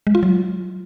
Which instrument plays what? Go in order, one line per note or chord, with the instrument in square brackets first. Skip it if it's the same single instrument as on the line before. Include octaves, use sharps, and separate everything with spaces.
[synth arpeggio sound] G#3
F4
F#3